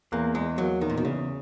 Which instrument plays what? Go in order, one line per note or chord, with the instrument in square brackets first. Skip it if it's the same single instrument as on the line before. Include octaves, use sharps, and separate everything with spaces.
[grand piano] E2 [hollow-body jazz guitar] A#3
[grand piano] E2 [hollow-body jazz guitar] G#3
[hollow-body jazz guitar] F#3 [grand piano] A#3
[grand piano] E2 [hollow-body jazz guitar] D#3
[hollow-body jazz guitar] A#2
B2
[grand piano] E2 [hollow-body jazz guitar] C#3